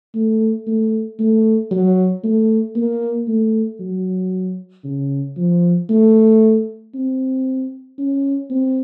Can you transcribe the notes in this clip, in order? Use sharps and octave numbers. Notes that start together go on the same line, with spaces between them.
A3
A3
A3
F#3
A3
A#3
A3
F#3
C#3
F3
A3
C4
C#4
C4